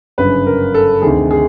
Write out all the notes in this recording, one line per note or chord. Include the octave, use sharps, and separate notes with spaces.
G1 F#2 C#3 B4
A#4
A4
D2 C3 D#3 G#4
G#4